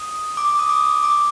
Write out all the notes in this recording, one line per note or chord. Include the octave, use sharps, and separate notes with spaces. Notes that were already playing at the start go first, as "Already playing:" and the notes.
Already playing: D#6
D6
D6
D#6
D6
D6